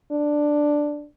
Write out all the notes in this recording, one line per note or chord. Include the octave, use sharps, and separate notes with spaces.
D4